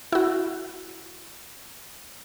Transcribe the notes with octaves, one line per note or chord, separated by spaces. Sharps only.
E4 F#4